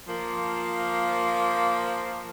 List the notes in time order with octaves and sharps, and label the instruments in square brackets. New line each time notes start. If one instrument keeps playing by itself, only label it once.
[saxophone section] F3 A#3